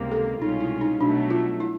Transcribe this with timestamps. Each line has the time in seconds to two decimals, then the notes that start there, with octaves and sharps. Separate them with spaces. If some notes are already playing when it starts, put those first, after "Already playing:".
Already playing: C#2 C3 D#3 G3 A#3
0.12 A4
0.41 C2 B2 G#3 C#4 D#4 F4
0.60 E4
0.81 D#4
1.00 B2 F#3 A3 D4
1.30 F4
1.60 E4